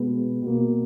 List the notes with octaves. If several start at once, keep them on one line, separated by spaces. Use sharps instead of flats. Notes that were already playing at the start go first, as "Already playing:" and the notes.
Already playing: B2 G#3 B3
B2 A#3